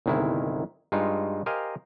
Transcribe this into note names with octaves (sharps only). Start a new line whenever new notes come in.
G1 C2 D#3 G#3 E4
G2 G#3 D#4 F4
G4 A#4 C5 D#5 F5 G#5